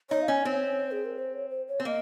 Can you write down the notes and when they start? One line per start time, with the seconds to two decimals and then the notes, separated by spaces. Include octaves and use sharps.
0.10 D#4 C#5
0.22 F5
0.28 C#4 D#5
0.45 C4 C#5
0.91 G#4
1.05 A#4
1.19 C5
1.33 C#5
1.50 C5
1.68 C#5
1.80 C4
1.85 A#3 D#5